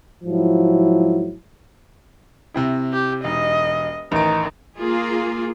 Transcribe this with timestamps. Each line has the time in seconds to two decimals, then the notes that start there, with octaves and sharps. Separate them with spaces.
0.24 G#2 F3 F#3 E4
2.54 C3 C4 E4
2.93 G4
3.24 E1 D#4 D#5
4.12 A1 D#3 D7
4.76 A#3 F4 G#4